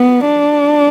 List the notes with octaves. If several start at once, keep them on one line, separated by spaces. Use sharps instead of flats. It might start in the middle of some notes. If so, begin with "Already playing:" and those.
Already playing: B3
D4